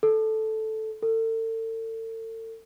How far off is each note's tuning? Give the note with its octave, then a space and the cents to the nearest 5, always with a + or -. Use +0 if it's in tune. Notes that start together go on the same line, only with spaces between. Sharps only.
A4 -5
A4 +40